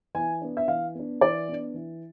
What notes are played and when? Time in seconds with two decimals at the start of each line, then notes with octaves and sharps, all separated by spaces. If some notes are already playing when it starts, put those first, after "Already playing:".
0.14 E3 G#5
0.41 B3 D4
0.57 E5
0.68 E3 F5
0.95 B3 D4
1.21 E3 D5
1.48 B3 D4
1.74 E3